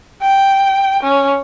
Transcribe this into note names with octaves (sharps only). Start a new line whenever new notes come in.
G5
C#4